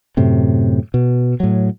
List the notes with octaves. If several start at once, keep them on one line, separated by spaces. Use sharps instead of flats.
F#2 A2 C3
B2
A2 F#3